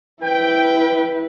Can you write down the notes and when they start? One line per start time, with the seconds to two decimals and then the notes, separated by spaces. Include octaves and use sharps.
0.23 E4 B4 G5